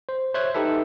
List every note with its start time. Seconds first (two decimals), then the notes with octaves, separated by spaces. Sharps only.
0.09 C5
0.34 C5 C#5 E5 F#6 G#6
0.54 D#4 G4 A4 B4 E5